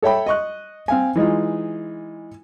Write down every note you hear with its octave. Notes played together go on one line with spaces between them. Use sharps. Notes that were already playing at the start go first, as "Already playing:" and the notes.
A4 C#5 E5 G5 B5
D#5 C#6 F#6
C4 F5 G#5
E3 G#3 D#4 F4